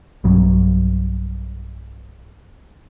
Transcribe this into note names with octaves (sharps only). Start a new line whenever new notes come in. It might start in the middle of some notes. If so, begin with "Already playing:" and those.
B1 G2 F#3